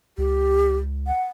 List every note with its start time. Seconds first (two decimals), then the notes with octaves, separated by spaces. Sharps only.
0.18 C#2 G4
1.07 F#5